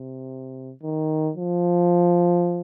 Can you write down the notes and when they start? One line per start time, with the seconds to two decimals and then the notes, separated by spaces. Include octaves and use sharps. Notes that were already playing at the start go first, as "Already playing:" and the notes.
Already playing: C3
0.83 D#3
1.37 F3